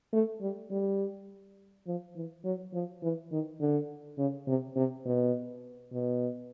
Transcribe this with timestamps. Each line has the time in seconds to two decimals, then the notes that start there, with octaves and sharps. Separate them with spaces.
0.13 A3
0.42 G3
0.71 G3
1.87 F3
2.16 E3
2.44 F#3
2.74 F3
3.03 E3
3.32 D#3
3.60 D3
4.18 C#3
4.48 C3
4.76 C3
5.06 B2
5.93 B2